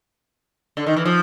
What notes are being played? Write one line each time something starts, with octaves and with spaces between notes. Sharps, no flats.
D3
D#3
E3
F3